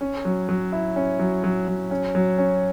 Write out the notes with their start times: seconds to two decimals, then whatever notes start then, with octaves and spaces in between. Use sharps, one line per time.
0.01 C#4
0.25 F#3
0.49 F#3
0.72 E4
0.96 C#4
1.19 F#3
1.44 F#3
1.68 F#3
1.91 C#4
2.15 F#3
2.38 C#4